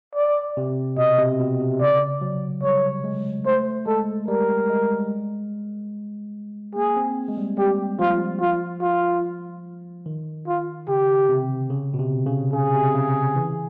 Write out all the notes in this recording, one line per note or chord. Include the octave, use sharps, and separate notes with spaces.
D5
C3
B2 D#5
C3
B2
C3
C3
C#3 D5
F#3
G3 C#5
G#3
A3 C5
G#3 A4
G3 A#4
G#3
A#3 G#4
C4
G#3
G3
G3 G4
F3 F4
F4
F4
D#3
F4
C#3 G4
C3
C#3
B2
C3
C#3
C#3 G#4
C3
C#3
E3